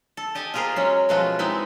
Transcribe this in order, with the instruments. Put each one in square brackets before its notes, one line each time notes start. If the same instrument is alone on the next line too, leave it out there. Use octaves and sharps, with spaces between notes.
[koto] A4
G4 D#5 G#5 A5
F4 G4 G#4 A#4 C5 F5
F#3 G#3 C#4
B2 F3 G#3 A3 F4 F#4
G#3 B3 C4 D#4 E4